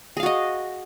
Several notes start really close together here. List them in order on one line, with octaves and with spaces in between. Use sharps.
G#4 F5 F#4 D#5